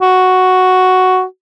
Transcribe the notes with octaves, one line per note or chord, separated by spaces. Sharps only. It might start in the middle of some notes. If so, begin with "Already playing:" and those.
F#4